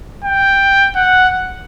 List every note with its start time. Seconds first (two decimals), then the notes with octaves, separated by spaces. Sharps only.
0.24 G5
0.95 F#5